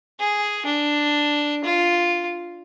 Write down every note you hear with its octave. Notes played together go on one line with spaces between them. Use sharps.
G#4
D4
F4